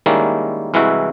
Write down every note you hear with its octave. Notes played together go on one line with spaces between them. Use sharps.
D#3 G3 G#3 A#3 C#4 E4
C2 E3 G#3 E4 F#4 E5